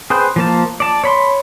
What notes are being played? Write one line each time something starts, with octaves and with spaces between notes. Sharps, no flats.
G#4 B4 C5 G5
F3 A#3 A5
D5 A5
C#5 B5 C6